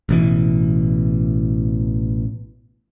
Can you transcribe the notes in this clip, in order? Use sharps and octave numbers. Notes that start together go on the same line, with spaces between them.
A1 B2 E3